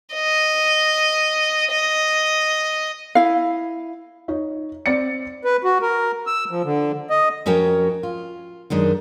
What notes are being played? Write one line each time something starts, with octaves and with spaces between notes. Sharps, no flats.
D#5
D#5
E4 F5
D#4 C#5
C4 D5 A6 C#7
B4
F#4
A#4
E6
F3
D3
D#5
F2 C#4 F#4 A#4 C#5 G5
F4
F#2 D#3 G#3 D4